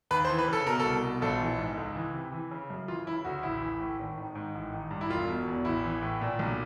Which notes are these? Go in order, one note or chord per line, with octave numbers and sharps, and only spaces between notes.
D#2 B4
C5
E3
B4
C#3 A4
B2 A#4
A4
C2
B2
A#1 A4
E3
G#2
C#2
E3
C3
E3
C#3
F#2
E3 F4
C#3 E4
D2 F#4
A1 E4
E3
A2
G#1
D#3
G#2
A1
D#3
G2
E4
E1 F4
B2
E2
A1 E4
E3
A2
A#2
B1